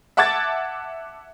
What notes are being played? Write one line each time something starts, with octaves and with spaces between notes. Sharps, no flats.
E5 F#5 A5 D6 G#6 A6